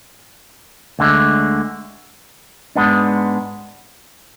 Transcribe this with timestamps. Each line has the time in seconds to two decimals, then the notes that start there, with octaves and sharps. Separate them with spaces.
0.99 D2 D3 G#3
2.76 G#2 G#3 B3 D4